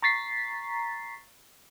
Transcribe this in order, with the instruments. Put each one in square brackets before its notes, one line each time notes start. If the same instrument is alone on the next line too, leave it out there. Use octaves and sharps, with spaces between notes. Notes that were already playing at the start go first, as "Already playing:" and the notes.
[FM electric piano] A#5 C#6 A6 B6 C7